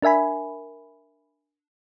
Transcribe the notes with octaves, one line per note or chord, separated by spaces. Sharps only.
D4 A#4 E5 G#5 B5